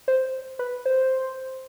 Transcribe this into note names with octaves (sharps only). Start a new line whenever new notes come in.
C5
B4
C5